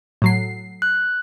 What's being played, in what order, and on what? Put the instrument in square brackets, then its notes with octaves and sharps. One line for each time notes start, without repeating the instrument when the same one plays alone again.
[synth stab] A2 F#3 C7
[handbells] F#6